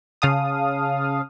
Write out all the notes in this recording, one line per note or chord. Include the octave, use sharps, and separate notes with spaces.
C#3 F5 A5 D#6